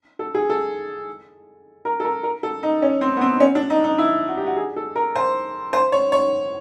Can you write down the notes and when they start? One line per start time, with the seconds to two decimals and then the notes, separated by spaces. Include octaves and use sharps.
0.19 A4
0.35 G#4
0.50 A4
1.85 A#4
2.00 A4
2.05 A#4
2.23 A#4
2.43 A4
2.63 D#4
2.82 C#4
3.01 C4
3.17 B3
3.21 C4
3.40 C#4
3.55 D4
3.70 D#4
3.84 D#4
3.98 E4
4.28 F#4
4.37 G4
4.47 F#4
4.57 G#4
4.76 A4
4.96 A#4
5.15 C5
5.73 C5
5.92 C#5
6.12 C#5